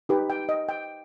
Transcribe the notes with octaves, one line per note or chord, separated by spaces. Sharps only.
D#4 G4 B4
G5
D#5
G5